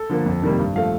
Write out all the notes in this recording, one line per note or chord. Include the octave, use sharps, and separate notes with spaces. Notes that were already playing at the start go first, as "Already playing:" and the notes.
Already playing: A4
D3 F3 A#3
F2
C3 D#3 G3 A#3
G2
F3 A3 F5